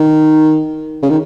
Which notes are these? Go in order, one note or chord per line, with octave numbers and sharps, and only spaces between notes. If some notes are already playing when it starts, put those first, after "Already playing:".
Already playing: D#3
C#3
D#3